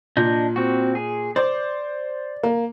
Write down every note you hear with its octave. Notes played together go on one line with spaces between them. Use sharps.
A#2 D4 D#5 G6
C4 F#4
G#4
C5 D5 D6
A#3